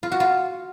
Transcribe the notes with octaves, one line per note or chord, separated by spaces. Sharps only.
F4
F#4
F4